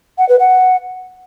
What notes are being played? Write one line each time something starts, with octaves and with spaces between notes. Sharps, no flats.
F#5
B4
F#5